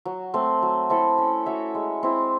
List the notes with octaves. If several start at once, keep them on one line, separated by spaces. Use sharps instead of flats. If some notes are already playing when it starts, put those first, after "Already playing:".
F#3
A3 C4
F#3
C4 E4 A4
C#4
F#4 C#5 E5
G#3
C4 E4